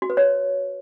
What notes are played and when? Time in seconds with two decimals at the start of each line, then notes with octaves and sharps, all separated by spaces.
0.02 F#4
0.10 B4
0.17 C#5